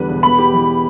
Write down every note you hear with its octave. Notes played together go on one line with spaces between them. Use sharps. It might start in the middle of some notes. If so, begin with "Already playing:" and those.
Already playing: E2 D3 G3 B4
E1
B3 B5
G4
E3